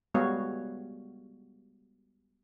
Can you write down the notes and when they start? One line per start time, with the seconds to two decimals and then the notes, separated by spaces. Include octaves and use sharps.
0.14 G3 G#3 B3 F#4 C#5 F5